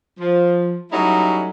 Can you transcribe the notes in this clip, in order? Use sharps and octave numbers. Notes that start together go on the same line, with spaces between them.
F3
F#3 G3 A3 C#4 D#4 E4